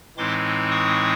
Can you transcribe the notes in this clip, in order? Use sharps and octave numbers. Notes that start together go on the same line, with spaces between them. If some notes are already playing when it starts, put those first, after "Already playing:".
A2 E3 G#3 C4 D#4 C6 D6
C#6 D#6